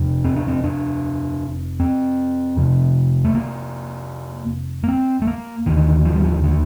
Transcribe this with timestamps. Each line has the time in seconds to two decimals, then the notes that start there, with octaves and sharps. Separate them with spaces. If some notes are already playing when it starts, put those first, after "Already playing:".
Already playing: F2 C3
0.24 C4
0.36 D4
0.48 C4
0.64 D4
1.80 C4
2.57 F2 C3
3.25 A3
3.35 A#3
4.84 A#3
4.89 C4
5.22 A3
5.28 A#3
5.66 D#2 D3 D#3
6.05 F3
6.15 G3
6.24 F3
6.44 D3